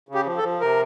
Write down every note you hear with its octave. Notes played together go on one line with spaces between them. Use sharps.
C#3
G4
F3
A4
F3
C3 A#4